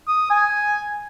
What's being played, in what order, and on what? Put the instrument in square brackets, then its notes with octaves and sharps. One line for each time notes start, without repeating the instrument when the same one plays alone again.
[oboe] D#6
G#5